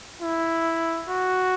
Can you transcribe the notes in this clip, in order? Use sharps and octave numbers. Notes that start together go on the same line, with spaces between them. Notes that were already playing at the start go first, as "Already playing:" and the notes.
E4
F#4